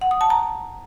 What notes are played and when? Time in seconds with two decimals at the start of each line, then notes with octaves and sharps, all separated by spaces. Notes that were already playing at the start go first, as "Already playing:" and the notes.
0.01 F#5
0.11 D#6
0.21 A5
0.30 A#5